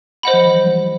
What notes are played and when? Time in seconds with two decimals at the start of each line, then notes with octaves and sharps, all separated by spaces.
0.23 C5 D#5 F#5 B5
0.34 F3
0.45 E3
0.55 F#3
0.67 G3